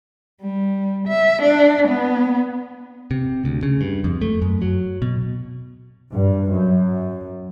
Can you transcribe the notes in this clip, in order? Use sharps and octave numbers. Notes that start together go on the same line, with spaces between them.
G3
E5
D4
B3
C3
D2
C#3
G2
F2
A3
F#2
F#3
B2
G2
F#2